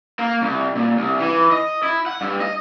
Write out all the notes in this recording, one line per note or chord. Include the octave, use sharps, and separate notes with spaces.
A#3
C2
A#2
C2
E3
D#5
E4
F#5
G2
D#5